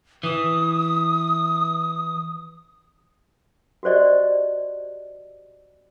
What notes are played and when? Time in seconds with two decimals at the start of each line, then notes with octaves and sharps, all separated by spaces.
0.23 E3 D#6
3.83 F#4 G4 C5 D5 D#5